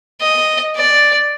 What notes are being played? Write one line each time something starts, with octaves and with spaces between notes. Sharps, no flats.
D#5
D5